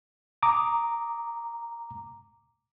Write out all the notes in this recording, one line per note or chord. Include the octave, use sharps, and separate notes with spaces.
A#5 D6 D#6